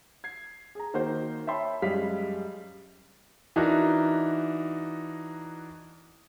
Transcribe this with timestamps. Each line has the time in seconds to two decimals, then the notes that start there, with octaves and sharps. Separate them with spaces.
0.24 G#6 C7
0.75 G#4 A#5
0.94 D#3 A#3 F#4 C5
1.47 C#5 E5 G5 A5 B5 C6
1.82 F#2 G3 G#3 F5 B6
3.56 E3 D4 D#4 F#4 A#4